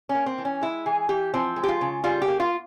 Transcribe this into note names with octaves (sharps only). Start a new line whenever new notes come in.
C#4
A#3
C4
E3
C#4
G#3 E4
E3 G#4
E3 G4
F3 C4
G#3
G4
F4
C#3
G3 F4
G4
A#3
F4